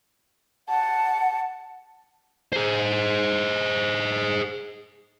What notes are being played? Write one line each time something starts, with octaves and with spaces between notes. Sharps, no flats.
F#5 A5
G#4 C5